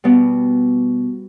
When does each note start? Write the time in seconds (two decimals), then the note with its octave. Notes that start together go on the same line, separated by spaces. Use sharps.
0.04 B2 G3 B3